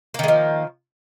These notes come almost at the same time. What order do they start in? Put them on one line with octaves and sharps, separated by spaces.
A#3 D#3 G#3 F3